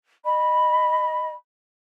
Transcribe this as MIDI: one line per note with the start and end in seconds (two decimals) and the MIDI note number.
0.22 1.30 75
0.22 1.30 83